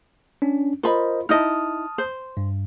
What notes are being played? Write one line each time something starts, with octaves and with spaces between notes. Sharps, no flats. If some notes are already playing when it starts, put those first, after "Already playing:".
C#4 D4
F4 A#4 C5 D#5 B5
D#4 E4 D#5 A5 D#6 F6
C5
G2